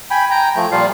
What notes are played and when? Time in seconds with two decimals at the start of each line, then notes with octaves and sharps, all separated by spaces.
0.11 G5 G#5 B5
0.31 G5 A#5
0.56 F3 A3
0.72 A#2 F3 G3 F4 F5